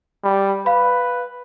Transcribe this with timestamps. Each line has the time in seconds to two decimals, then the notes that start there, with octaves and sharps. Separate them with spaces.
0.24 G3
0.66 B4 F5 B5